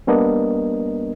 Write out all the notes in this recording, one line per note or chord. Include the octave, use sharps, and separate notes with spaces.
G3 A#3 B3 D4 A#4 D#5